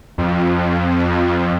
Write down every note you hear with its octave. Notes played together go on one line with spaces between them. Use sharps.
F2